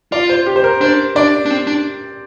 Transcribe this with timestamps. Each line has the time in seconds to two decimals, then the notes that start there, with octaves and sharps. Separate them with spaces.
0.12 F4 D5
0.29 C5
0.46 G4
0.56 C5
0.64 A#4
0.81 D4 C5
1.16 D4 D5
1.46 D4
1.51 C4
1.67 D4